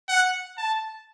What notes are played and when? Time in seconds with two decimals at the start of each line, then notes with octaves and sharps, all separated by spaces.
0.08 F#5
0.58 A5